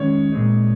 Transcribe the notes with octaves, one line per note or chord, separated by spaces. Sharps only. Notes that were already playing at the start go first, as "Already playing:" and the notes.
Already playing: D#3 G#3 C#4 C#5
A#2 G#3 C4 D#4